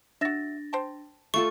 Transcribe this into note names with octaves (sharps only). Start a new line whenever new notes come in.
D4 F#4 E5 A6 A#6
C5 G5 A5
A3 F4 A4 C#6